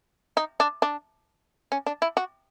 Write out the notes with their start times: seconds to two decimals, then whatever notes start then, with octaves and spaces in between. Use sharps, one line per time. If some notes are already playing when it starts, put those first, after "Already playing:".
0.37 D#4
0.60 D4
0.82 D4
1.72 C#4
1.86 D4
2.02 E4
2.17 F#4